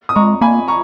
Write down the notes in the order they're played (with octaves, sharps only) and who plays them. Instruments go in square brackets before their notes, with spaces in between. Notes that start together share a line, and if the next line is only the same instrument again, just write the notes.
[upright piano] D#6
[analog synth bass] G#3 [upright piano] A#5 C#6
[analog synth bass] A#3 [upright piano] G#5 B5
[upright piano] A#5 C#6